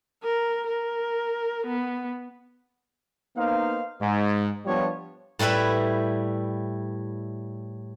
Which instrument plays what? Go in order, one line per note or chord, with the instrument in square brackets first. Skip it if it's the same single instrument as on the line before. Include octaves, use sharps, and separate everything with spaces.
[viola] A#4
A#4
B3
[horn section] A#3 B3 D#4 C5 F5
G#2
F3 G3 B3 D4 F4 C#5
[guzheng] A2 G3 E4 B4 E5